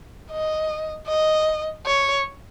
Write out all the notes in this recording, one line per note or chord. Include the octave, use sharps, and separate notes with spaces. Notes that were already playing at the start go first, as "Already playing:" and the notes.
D#5
D#5
C#5